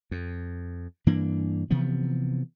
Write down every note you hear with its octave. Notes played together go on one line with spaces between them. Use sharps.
F2
G2 E3 A#3 D4
C3 E3 F3 B3